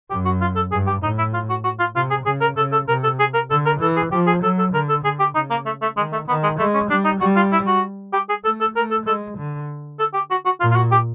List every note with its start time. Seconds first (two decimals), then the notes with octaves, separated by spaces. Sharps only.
0.10 F#2 G4
0.25 F#4
0.41 F4
0.56 A4
0.72 G2 G#4
0.87 G4
1.02 A2 D#4
1.18 E4
1.34 F4
1.49 F#4
1.64 F#4
1.79 F4
1.95 C3 F4
2.10 G#4
2.25 C#3 G#4
2.41 A#4
2.57 C#3 A4
2.72 A4
2.88 C3 A#4
3.03 A4
3.19 G#4
3.34 A#4
3.50 D3 A4
3.66 A#4
3.80 E3 A4
3.96 G#4
4.12 F3 G4
4.26 G#4
4.43 F#3 A4
4.58 A4
4.73 D3 A#4
4.89 A4
5.04 D3 G#4
5.19 G4
5.35 C#3 D#4
5.50 A#3
5.66 A3
5.82 A3
5.97 D#3 G#3
6.12 A3
6.28 D#3 B3
6.43 G#3
6.59 G#3 A3
6.74 C#4
6.90 G3 D4
7.05 D#4
7.20 G3 F#4
7.36 F4
7.52 E4
7.67 F#4
8.13 G4
8.29 G#4
8.44 A3 A4
8.60 A4
8.76 A3 A#4
8.91 A4
9.06 G#3 A4
9.38 D3
9.99 A4
10.14 G4
10.30 F#4
10.45 F#4
10.60 A#2 F4
10.71 F4
10.76 F#4
10.91 G4